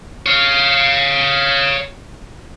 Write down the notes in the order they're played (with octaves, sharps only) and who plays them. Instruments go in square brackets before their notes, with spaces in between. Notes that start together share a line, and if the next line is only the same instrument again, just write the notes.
[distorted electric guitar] C#5 F5